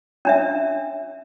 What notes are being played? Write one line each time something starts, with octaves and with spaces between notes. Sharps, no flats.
C#4 D4 E5